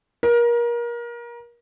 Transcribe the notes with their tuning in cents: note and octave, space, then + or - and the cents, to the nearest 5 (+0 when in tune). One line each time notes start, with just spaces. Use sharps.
A#4 +30